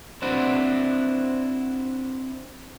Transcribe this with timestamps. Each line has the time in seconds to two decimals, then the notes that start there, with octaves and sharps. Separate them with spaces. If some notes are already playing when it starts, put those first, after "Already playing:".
0.22 C4 D4 E4 F#4